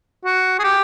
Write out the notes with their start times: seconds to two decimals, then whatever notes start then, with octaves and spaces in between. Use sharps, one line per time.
0.25 F#4
0.59 G#4
0.64 G4